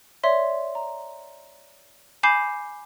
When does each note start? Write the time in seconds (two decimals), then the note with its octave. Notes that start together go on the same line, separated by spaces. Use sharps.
0.24 C#5 D5 E5 C6
0.75 A#5
2.23 G#5 B5 D6 G6 C7 E7